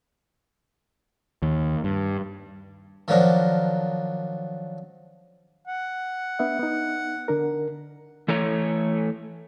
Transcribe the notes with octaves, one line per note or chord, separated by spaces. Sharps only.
D#2
G2
D#3 F3 F#3 D4 A#4
F#5
B3 D4 E5
B3 D#4
D3 D4 A#4
E3 A3 A4 C#5 A#5